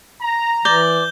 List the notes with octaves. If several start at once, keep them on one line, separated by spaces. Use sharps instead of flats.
A#5
E3 D5 G6 G7